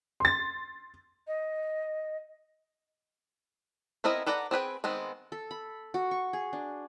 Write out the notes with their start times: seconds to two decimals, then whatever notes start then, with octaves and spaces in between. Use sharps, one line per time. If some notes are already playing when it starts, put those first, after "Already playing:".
0.20 C6 A6
1.27 D#5
4.04 B3 C4 E4 A#4 D#5
4.26 A4 B4 D5 F#5 A#5
4.51 C4 G#4 B4 G5
4.84 D#3 G#3 B3 C4
5.32 A4
5.51 B5
5.94 F#4
6.11 C#6
6.33 G#4
6.53 D4